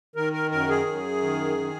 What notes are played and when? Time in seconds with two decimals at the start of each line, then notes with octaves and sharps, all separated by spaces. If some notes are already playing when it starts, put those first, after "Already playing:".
0.16 D#3 A#4
0.33 A#4
0.51 F#2 A#4
0.69 G#4
0.86 F#2
1.22 D#3
1.58 D#3